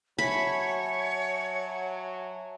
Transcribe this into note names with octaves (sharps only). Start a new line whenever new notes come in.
F#3 C#5 E5 G#5 A5 B5